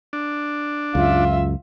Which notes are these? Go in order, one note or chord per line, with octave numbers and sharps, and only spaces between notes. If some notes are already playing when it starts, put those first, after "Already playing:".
D4
C#2 F#2 F4 E5